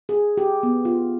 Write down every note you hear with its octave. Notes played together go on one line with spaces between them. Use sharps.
G#4
G4
B3
F4